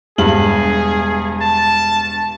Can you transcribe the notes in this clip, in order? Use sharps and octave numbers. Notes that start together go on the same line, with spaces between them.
E1 G2 G#4 F#7
A5